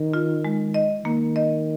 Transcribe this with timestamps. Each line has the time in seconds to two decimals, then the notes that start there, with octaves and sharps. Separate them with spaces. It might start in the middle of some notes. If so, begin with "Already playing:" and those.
Already playing: D#3 A#4
0.14 F4
0.45 G#3
0.74 D#5
1.05 D#3 A#3
1.36 D#5